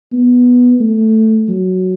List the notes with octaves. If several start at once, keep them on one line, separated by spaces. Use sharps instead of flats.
B3
A3
F#3